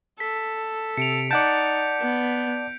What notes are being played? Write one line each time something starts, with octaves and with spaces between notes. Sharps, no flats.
A4 B6
C3 C#7 D7 F7
D#4 D5 F#5 A5 G6 D7
B3